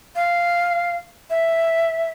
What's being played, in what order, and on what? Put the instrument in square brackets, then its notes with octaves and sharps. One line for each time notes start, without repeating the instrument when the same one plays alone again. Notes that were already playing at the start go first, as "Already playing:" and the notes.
[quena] F5
E5